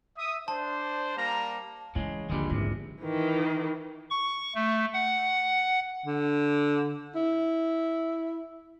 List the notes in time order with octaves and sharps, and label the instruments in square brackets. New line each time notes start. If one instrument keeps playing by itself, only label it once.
[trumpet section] E5 D#6
[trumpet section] D4 C5 [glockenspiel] A5
[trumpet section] G3 A#3 A#5
[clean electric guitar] C#3 G#3 [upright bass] E3 E4
[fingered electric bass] D#1 A#1 [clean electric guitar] G2 G3 G#3 [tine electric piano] D3
[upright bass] G#1 [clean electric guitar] E2 C3
[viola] D#3 E3
[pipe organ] C#6
A3
F#5
[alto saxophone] D3
E4